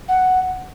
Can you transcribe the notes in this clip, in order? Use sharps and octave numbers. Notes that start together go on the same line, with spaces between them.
F#5